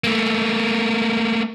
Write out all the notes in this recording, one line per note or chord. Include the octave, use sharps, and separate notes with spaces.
A3 A#3